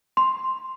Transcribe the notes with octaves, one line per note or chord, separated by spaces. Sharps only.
C6